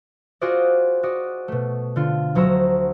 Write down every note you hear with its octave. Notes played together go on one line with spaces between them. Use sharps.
F4 F#4 G#4 C5 D5 D#5
F#4 D5 D#5
B2 A3
D3 F4
D2 F#3 C5 A#5 E6